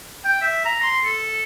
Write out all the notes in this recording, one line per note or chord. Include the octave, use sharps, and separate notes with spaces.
G5
E5
A#5
C6
A4